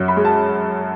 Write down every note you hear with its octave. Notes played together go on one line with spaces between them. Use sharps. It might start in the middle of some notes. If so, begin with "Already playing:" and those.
Already playing: F#2 F#3
B5
G#3
A5